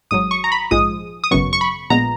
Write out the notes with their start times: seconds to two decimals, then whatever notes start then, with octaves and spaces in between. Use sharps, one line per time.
0.11 G#1 G#2 F#3 D#6
0.31 C#6
0.44 A#5
0.52 B5
0.71 A#1 G#2 F3 G#3 D#6
1.24 D#6
1.31 G#1 F#2 C#3 F#3 B3 C#6
1.53 C#6
1.61 B5
1.90 A#1 A#2 G#3 B3 A#5